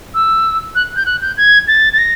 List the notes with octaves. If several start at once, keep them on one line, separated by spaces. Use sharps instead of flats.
E6
F#6
G6
F#6
G6
G#6
A6
A6
A#6